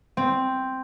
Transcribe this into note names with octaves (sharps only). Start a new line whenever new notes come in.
C4